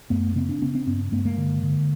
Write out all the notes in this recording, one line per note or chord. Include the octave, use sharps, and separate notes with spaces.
F#2 A3 B3
C#3 A#3 C4
C4 D4
C#3 B3 C#4
C4 D4
G2 B3 C#4
G2 A3 B3
G#3 A#3
D3
D3